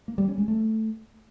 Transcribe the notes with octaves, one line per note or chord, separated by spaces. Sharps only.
A#3
G3
C#4
G#3
A3